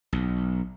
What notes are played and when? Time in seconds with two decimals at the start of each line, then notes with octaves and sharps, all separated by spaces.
0.13 B1